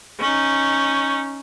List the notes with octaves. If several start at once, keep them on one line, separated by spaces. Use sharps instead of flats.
C#4 D#4